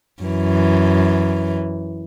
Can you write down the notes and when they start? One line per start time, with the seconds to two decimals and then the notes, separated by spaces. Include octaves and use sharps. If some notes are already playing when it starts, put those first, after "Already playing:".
0.23 F#2 E3